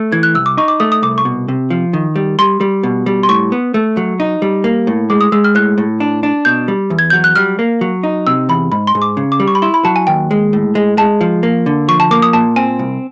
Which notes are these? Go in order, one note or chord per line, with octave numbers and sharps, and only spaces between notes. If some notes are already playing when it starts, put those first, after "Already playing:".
Already playing: A3
E3 G#6
F#6
C2 E6
D6
D#4 C#6
D6
A3 D#6
D#6
C2 D6
C#6
B2
C3
F3
D#3
G3
G3 C6
G3
B2
G3
C6
A2 C#6
B3
A3
F#3
D#4
G3
A#3
A2
G#3 D6
D#6
G#3 E6
F6
A2 F#6
A2
D4
D4
B2 G6
G3
E2
G#6
F#3 G6
F#6
G3 F6
A#3
F#3
D#4
C3 E6
E2 B5
G#2 B5
C6
G#2
D6
C#3
D6
G3
C#6
B5
E4 C6
B5
F#3 A5
G#5
D#2 G5
G#3
A2
G#3
G#3 A5
F3
A#3
D3
F3 C#6
A5
A#3 D6
D#6
A#2 A5
C4 G#5
C2